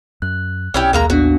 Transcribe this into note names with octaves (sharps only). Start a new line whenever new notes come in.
F#2 F#6
B1 C#4 E4 G4
D#2 G#3 A#3 A#5
A1 B3 D4 F#4